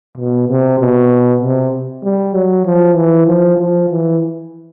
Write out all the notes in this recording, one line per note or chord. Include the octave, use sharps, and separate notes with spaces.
B2
C3
B2
C3
G3
F#3
F3
E3
F3
F3
E3